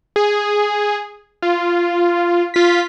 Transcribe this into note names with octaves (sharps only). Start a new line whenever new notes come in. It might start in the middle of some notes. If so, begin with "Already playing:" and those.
G#4
F4
F4 B6